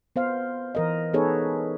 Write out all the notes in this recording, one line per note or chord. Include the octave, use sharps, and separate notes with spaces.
B3 C5 F5
E3 A#4 D#5
B3 D#4 G#4 A4 B4 C#5